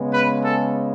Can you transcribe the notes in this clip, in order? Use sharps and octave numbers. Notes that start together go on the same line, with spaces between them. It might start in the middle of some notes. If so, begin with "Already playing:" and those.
Already playing: C#3 G#3 B3
B4
A4